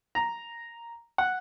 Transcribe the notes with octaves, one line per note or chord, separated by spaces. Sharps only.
A#5
F#5